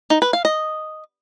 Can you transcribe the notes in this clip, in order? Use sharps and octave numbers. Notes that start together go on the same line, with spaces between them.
D#4
B4
F5
D#5